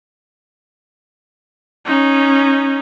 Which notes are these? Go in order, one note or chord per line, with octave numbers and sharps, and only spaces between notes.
C#4 D#4